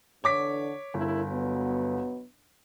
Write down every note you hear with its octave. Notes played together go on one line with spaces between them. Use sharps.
E2 D3 C#5 D6 B6
G1 C#3 E4 A#4
B2 F#3 B3